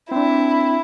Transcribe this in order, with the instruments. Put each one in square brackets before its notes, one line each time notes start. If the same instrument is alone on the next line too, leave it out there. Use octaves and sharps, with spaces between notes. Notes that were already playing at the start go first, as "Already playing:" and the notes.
[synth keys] C4 D4 [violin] E4